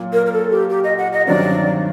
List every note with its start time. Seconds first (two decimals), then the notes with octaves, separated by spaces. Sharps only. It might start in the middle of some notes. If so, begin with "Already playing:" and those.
Already playing: A#2 F#3
0.13 A#4
0.26 A#4
0.32 A4
0.51 G4
0.70 G4
0.84 D#5
0.98 F#5
1.13 D#5
1.27 G2 D#3 F#3 C4 D5